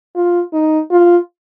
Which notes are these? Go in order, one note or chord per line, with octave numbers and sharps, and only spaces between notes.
F4
D#4
F4